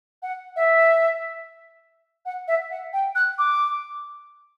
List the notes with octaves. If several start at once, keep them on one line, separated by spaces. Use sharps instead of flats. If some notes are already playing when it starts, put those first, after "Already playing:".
F#5
E5
F#5
E5
F#5
G5
F#6
D6